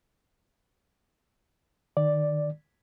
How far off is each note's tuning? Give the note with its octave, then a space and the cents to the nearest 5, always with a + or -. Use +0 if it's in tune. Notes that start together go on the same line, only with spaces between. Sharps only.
D#3 -35 D5 +0